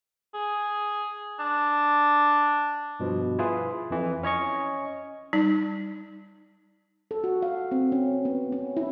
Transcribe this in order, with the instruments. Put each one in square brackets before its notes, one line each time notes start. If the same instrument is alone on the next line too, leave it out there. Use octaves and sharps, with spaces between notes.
[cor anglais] G#4
D4
[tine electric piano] G2 B2 F3
E4 F4 G#4 B4
F2 E3
C#4 C#5 D#5 C#6
[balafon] G3 D#4
[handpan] A4
F#4
F5
C4
C#4
B3
C#4
E4